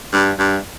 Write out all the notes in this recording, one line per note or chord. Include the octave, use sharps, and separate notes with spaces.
G2
G2